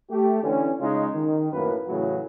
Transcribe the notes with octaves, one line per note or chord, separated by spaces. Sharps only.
A3 G4
D3 E3 C#4
C#3 G#3 D#4 F4
D#3
F#2 A2 A#3 B4
A2 C#3 E3 F#3 F#4